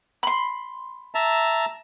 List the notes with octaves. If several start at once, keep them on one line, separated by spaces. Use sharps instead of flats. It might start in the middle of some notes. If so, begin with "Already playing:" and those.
B5 C6
E5 A5 A#5